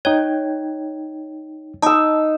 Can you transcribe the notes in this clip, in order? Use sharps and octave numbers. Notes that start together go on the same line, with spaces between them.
D#4 C#5 G5 G#6
D#4 A5 D#6 E6